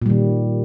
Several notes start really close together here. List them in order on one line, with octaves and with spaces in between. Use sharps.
A#2 G3 D#3